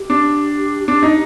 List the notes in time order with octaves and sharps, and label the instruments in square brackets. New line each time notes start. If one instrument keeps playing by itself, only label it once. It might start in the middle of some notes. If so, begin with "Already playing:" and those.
Already playing: [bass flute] G4
[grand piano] D4
D4
D#4